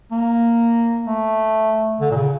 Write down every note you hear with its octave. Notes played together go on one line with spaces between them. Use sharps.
A#3
A3
D3
A#2
C#3